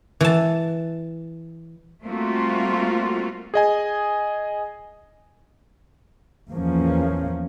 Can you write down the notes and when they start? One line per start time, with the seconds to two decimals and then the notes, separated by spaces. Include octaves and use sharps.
0.21 E3 A5
2.03 G3 A3 A#3 C4 F4 F#4
3.54 G#4 D#5 G#5
6.51 E2 F3 A#3 C#4